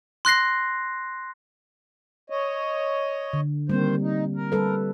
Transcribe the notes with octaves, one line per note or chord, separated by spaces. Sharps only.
C6 F#6 A#6 C7
C#5 D#5
D3
D#3 G3 A#3 C4 C5
D#4
A#4
G3 A4 B4